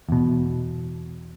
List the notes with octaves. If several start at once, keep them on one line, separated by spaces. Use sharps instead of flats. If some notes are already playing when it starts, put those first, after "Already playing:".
E2 B2